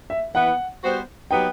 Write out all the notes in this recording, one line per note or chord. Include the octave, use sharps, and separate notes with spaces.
E5
E3 B3 E4 B4 F#5
G3 B3 F#4 C5
F#3 B3 D#4 G4 B4 G5